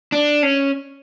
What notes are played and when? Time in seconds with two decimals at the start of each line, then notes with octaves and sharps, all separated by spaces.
0.12 D4
0.43 C#4